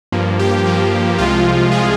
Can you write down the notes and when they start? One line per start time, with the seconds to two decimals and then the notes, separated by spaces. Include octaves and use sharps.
0.12 G2 F3 A#3
0.39 G4
0.66 G2 F3 A#3
1.18 C2 C3 F3 G#3 F4
1.72 C3 F3 G#3 G#4